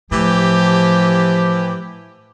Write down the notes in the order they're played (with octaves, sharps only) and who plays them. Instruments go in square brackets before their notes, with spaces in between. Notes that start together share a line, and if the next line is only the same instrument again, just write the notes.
[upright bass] A2 [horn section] E3 G4 [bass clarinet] F3